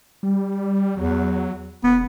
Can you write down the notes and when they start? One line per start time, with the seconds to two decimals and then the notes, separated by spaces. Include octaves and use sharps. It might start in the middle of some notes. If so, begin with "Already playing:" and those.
0.23 G3
0.97 E2 F#3
1.84 E1 B3